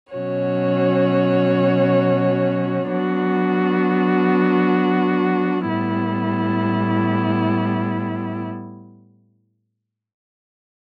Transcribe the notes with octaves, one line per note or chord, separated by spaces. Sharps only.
B2 F#3 C#4 F#4 C#5
F#3 B3 D4 F#4
A2 G3 B3 E4